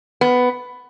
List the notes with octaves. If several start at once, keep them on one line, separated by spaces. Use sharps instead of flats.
B3